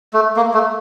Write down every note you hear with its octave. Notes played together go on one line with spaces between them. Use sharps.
A3
A#3
A3